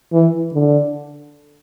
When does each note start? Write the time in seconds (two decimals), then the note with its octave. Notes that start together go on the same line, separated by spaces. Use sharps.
0.12 E3
0.53 D3